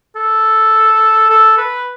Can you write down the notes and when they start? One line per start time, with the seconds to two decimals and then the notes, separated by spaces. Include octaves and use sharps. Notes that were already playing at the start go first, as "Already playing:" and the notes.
0.16 A4
1.30 A4
1.58 B4